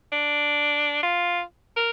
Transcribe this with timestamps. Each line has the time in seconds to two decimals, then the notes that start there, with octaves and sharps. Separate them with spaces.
0.12 D4
1.03 F4
1.76 A#4